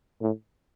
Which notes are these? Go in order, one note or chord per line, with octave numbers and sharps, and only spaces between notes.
A2